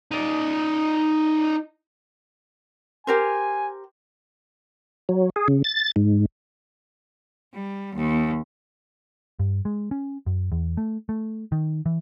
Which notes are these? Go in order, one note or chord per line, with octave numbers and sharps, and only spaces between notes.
D#4 D5
G4 A#4 C5 G#5
F#3
G#4
C#3
A6
G#2
G3
D#2
G2
G#3
C#4
F#2
E2
A3
A3
D#3
E3